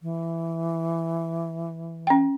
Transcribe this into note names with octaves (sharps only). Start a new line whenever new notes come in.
E3
C#4 G5